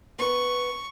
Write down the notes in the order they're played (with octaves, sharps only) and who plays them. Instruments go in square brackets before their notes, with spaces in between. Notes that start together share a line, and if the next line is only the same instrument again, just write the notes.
[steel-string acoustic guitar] B3 B4 [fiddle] C#6